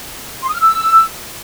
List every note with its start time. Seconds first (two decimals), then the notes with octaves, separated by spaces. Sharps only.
0.43 C6
0.49 D#6
0.55 F6
0.61 E6